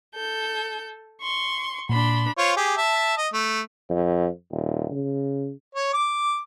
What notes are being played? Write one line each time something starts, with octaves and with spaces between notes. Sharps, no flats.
A4 G6
C6 C#6
A#2 D4 B5 C6
F4 C5 C#5
G4 G#4
E5 A5
D#5
A3
F2
D#1
C#3
C#5
D6